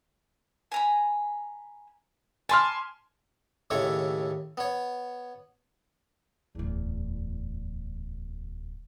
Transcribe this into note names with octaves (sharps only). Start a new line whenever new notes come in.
G#5 A#5 B5
G#5 A5 B5 C6 D6 F6
D#2 A2 C#3 A3 C#5 C#6
B3 C#5
D1 E2